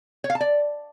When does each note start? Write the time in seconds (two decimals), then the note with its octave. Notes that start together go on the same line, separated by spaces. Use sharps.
0.24 C#5
0.30 F5
0.35 A5
0.41 D5